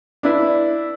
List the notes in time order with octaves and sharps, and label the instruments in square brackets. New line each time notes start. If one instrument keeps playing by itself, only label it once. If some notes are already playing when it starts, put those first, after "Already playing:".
[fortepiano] D4 E4 B4